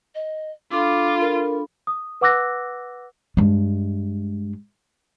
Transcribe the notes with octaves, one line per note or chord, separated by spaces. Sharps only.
D#5
D4 F4 A4 B5 D6
A#4
D#6
B4 F#5 D6 E6 F#6 A#6
G2 G#3